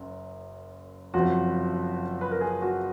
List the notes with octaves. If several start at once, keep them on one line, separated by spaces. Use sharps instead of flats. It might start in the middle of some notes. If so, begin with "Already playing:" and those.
Already playing: F#1 F#2
F#1 F2 F3 F#4
B4
A#4
G#4
F#4